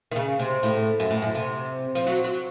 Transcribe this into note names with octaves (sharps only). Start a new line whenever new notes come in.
D#3
C#3
C3
A2
F#2
A2
F#2
C3
F3
F#3
F#3